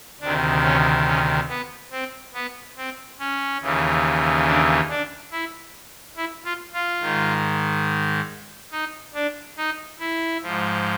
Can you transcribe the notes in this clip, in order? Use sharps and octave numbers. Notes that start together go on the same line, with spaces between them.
D2 C3 D#3 D4
C#4
C#4
B3
C4
B3
C4
C#4
D#2 C#3 E3
D4
D4
E4
E4
F4
F4
G#2 D#3
D#4
D4
D#4
E4
G#2 F3